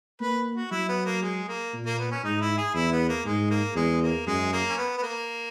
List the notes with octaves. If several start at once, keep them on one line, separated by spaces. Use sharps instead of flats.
A#3 B4
F#4
F#3 E4
B3
A#3
G#3
A#3
A#2
A#3
B3
C#4
G#2 D#4
E4
G#4
E2 E4
B3
A#3
G#2 G#3
A#3
E2 G#3
A#3
F#2 G#3
A#3
C#4
B3
B3
A#3